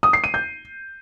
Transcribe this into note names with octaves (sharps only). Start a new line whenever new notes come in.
D#6
C7
D#7
G6